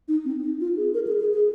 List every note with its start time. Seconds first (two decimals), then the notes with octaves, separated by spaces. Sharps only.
0.08 D#4
0.25 C4
0.43 D#4
0.61 F4
0.77 G#4
0.94 A#4
1.07 G#4
1.20 G#4
1.34 G#4